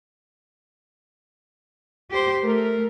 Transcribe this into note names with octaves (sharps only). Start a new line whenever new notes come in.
G4 C5
A3 A#4